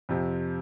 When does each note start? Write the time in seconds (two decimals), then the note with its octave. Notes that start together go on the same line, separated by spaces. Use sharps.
0.09 F2 C3 F3